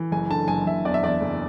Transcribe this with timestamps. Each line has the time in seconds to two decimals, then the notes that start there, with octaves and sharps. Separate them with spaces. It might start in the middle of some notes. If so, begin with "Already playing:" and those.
Already playing: E3
0.12 F#1 G#5
0.30 D3 A5
0.48 F#1 G#5
0.66 F#1 E5
0.85 E2 D5
0.94 E5
1.03 E2 D5
1.21 F#1